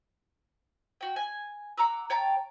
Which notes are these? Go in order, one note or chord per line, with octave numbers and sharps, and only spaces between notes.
F#4 G5
G#5
F#5 A#5 D6 E6
C#5 G5 A5 A#5